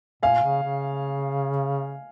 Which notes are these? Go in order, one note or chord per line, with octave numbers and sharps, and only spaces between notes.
A#2 F5 G#5
C#3
C#3